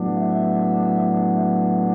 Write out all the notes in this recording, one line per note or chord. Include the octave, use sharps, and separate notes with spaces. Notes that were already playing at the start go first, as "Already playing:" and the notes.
Already playing: A2 F#3 B3 D4
E5
E5